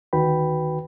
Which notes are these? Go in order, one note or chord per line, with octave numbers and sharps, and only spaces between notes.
D2 D#3 F#4 B4 G5 B5